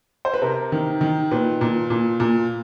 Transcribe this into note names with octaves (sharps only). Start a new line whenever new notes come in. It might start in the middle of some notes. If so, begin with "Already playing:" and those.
C5
B4
C3 A#4
D#3
D#3
A#2 B4
A#2
A#2
A#2